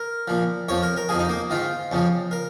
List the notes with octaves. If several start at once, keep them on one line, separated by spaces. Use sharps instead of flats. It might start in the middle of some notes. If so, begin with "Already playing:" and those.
Already playing: A#4
A#2 F3
F2 F3 C#5
A#4
A#4
F2 F3 G#4
D#4
A#3
G#2 D#3 F4
F2 C#3 F3
A#4